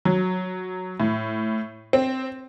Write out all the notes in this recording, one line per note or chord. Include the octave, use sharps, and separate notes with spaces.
F#3
A2
C4